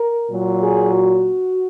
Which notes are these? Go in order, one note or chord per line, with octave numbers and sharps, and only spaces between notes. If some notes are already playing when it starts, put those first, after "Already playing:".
Already playing: A#4
A#2 F#3
G#4
F#4